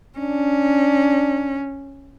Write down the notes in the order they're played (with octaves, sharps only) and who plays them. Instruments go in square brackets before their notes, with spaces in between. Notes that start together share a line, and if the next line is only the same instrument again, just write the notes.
[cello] C#4 [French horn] D4